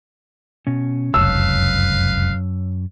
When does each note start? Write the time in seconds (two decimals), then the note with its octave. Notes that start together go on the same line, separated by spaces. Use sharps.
0.67 B2 C#4
1.14 F1 C#2 F#2 B4 C#5 F5 A5 E6